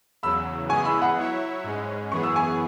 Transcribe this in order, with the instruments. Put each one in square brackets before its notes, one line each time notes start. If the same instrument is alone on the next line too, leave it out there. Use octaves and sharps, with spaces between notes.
[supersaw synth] E2 C#3 F#3 [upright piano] B5 E6
[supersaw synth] C#3 E3 G#3 B3 G#4 [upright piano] G#5 C#6
[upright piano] B5 E6
F#5 B5
[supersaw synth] F#3 E4 C#5 E5
G#2 G#3 C#4
[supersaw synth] F#2 E3 B3 G#4 [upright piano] C#6
[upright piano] E6
G#5 C#6